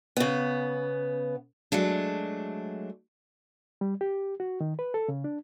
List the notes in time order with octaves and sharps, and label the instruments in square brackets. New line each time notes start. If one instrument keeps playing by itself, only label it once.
[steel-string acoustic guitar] C#3 B3
F#3 G#3 A3 D4
[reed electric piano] G3
G4
F#4
D#3
B4
A4
C#3
D4